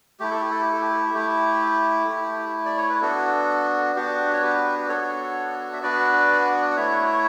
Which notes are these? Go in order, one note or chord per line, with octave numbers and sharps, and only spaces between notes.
A3 E4 G4
A4
G4
A4
G4
A4
G4
A3 E4 G4
A3 E4
D5
C#5
B4
B3 D4 F#4 A4
B3 D4 F#4 G4
C#5
G4 B4
B3 D4 F#4 A4 C#5
E5
B3 D4 F#4 B4 D5
F#5
A3 E4 C#5 E5